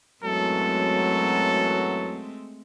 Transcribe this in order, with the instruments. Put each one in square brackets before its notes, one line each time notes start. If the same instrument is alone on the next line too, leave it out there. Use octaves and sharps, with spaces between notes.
[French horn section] F#2 E3 F#3 [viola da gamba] G#3 A3 C4 [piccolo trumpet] A4